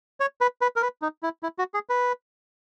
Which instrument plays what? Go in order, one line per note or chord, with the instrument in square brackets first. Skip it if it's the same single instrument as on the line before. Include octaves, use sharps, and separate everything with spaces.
[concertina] C#5
B4
B4
A#4
B4
D#4
E4
E4
F#4
G#4
B4